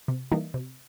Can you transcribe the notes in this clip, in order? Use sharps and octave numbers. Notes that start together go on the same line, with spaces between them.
C3
E3 G3 A#3 D#4
C3